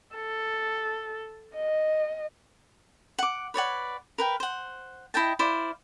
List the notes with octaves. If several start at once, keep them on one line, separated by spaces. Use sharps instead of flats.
A4
D#5
F#5 D6
B4 C#5 D5 F#5
A#4 B4 G5
C5 F#5
E4 D#5 G5 A5
E4 C5 D5 F5